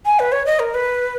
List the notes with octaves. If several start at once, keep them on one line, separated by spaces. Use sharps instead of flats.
G#5
B4
C#5
D#5
A#4
B4